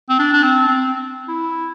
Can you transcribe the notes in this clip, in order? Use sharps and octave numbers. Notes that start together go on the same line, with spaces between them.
C4
D4
D4
C4
C4
E4